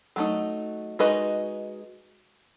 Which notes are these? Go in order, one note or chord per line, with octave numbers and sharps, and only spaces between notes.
F#3 A3 D#4
G#3 D#4 F#4 B4 D#5